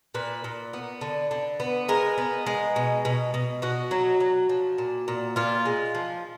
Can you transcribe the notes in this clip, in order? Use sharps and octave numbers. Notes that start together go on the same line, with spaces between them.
A#2 B4
A#2
B3
D3
D3
B3
G#3 A#4
B3
G#3
B2
B2
B2
B2 F#4
F#3
F#3
F3
A#2
A#2
A#2 F4
G#3
F3